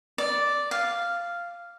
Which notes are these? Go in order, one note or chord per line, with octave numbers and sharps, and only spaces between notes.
D5
F5